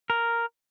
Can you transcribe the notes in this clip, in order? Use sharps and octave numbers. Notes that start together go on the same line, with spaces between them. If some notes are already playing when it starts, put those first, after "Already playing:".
A#4